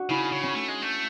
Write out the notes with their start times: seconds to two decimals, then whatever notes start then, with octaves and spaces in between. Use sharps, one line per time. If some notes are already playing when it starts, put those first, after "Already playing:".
Already playing: D4 F#4
0.10 C#3 E4
0.32 C#3
0.43 C#4
0.55 A3
0.68 G#3
0.82 A3